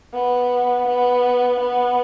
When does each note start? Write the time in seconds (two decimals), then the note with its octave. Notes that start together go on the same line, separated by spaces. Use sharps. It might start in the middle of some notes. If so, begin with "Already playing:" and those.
0.14 B3
0.87 B3
1.60 B3